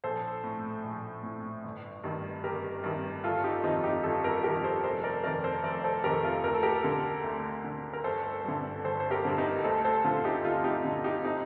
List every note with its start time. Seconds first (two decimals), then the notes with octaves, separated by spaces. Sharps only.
0.04 A#1 A4 C5
0.44 A2
0.84 A#1
1.23 A2
1.64 G1
2.04 G2 D#3
2.44 G1 G4 A#4
2.84 G2 D#3
3.24 G1 F4 A4
3.44 D#4 G4
3.63 F2 D#3 C4 D#4
3.84 D#4 G4
4.03 G1 F4 A4
4.24 G4 A#4
4.43 F2 D#3 G4 A#4
4.64 A4 C5
4.84 F1 A4 C5
5.04 A#4 D5
5.24 F2 D#3 A#4 D5
5.44 A4 C5
5.64 F1 A#4 D5
5.84 A4 C5
6.04 F2 D#3 G4 A#4
6.25 F4 A4
6.44 D2 A#4
6.54 A4
6.63 G4 A#4
6.84 D3
7.24 D2
7.64 D3
7.93 A#4
8.04 G1 A4 C5
8.44 G2 D3
8.85 G1 A4 C5
9.00 C5
9.11 G4 A#4
9.25 G2 D3
9.38 D#4 G4
9.64 D2 A4 C5
9.84 A4 C5
10.04 D3 F4 A4
10.25 D#4 G4
10.44 D2 F4 A4
10.55 F4
10.64 D#4 G4
10.85 D3
11.04 D#4 G4
11.24 C4 D#4